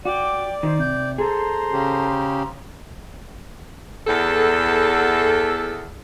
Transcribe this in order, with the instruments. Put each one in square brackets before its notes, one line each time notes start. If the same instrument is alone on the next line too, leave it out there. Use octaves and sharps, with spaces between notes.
[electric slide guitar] F#4 [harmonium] D5 [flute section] G5 D6
[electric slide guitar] D#3 [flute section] C5
[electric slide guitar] C3 [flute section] G6
[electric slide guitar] G#4 A4 [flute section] C5 A#5 C6
[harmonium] C#3 C#4 G4
[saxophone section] E2 A4